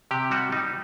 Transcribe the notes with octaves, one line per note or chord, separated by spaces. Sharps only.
C3 G4
G3 F#4
G3 D#4